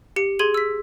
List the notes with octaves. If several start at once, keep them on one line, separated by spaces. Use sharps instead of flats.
G4 C#7
G#4 C6 G#6 D#7 F#7
E6 B6